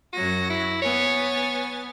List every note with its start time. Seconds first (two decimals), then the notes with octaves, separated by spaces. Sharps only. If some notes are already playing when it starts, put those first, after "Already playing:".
0.13 F#2 F#3 F#4 A#6
0.50 E4
0.82 B3 C#5 G#5 A6